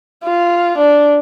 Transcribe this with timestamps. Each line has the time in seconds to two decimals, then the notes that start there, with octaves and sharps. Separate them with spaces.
0.24 F4
0.78 D4